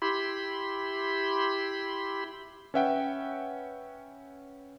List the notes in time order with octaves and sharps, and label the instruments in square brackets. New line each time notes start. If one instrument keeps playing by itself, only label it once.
[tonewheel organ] E4 G4 B5 C6
[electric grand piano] C#4 B4 E5 F#5 G5